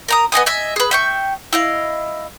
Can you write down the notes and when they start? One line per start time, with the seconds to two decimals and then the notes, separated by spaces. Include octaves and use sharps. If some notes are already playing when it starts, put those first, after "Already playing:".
0.08 A#4 A#5 D#6
0.32 B3 D#5 G#5 D#6
0.46 D#5 E5 G#5
0.76 G#4 B4
0.91 E5 G5 C#6
1.53 E4 D#5 F5